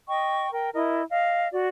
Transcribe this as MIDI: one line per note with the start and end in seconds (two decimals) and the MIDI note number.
0.08 0.50 75
0.08 0.50 79
0.08 0.50 85
0.52 0.69 70
0.52 0.69 79
0.73 1.03 64
0.73 1.03 70
0.73 1.03 75
1.09 1.48 75
1.09 1.48 77
1.52 1.68 66
1.52 1.68 74